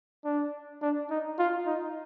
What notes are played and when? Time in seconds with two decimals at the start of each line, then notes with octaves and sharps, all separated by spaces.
0.25 D4
0.82 D4
1.10 D#4
1.39 F4
1.66 D#4